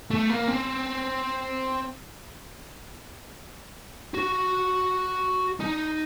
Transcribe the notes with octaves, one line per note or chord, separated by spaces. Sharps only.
A3
A#3
C4
F#4
D#4